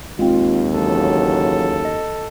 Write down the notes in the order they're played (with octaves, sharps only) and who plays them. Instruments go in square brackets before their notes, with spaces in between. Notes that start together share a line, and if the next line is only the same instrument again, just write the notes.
[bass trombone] D#2 [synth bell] G#3 C4 [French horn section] F4
[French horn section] C#3 E3 F#3 [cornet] A4
[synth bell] D#5